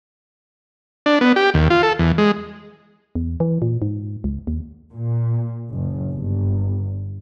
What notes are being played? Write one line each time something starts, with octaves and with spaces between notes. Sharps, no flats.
D4
B3
G4
D#2
F4
A4
E2
G#3
E2
E3
A#2
G#2
C#2
D#2
A#2
F#1
G1